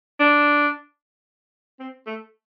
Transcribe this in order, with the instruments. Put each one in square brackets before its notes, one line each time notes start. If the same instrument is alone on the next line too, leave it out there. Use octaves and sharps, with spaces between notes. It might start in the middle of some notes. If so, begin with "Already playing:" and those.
[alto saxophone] D4
C4
A3